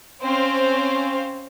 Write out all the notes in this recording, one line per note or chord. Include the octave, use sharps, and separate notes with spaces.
C4 C#4 C5 F5